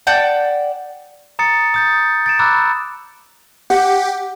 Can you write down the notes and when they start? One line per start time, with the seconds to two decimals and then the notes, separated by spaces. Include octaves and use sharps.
0.07 D5 F#5 G5 A5
1.39 A#5 D#6 A6 C#7
1.74 D#6 G6 A6
2.26 A6 D7 E7
2.39 A#5 B5 D6 E6 F#6 A6
3.70 G4 F#5